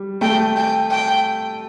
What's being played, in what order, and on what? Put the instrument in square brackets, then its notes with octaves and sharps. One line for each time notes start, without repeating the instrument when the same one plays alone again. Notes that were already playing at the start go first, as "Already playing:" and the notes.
Already playing: [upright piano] G3
[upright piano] A3 [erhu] G5
[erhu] G5
G5